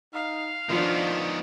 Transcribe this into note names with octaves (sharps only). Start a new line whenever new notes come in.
D#4 F5
D#3 F3 B3 D4 F4